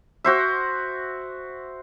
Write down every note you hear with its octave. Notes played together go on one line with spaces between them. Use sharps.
F#4 C5 E5